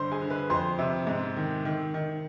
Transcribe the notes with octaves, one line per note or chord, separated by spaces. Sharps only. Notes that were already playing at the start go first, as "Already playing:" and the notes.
Already playing: G2 D3 C5 C6
G#4 G#5
D3
B4 B5
F2 C5 C6
C3
G#2
D#3
D#3
D#3